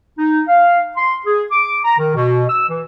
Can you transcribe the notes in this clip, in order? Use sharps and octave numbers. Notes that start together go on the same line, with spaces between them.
D#4
F5
C6
G#4
D6
A#5
D#3
B2
E6
E3